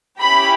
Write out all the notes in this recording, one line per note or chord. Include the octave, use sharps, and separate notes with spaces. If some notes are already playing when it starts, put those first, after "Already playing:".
C#4 E4 G4 B5